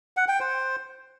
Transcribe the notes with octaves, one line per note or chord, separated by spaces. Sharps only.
F#5
G5
C5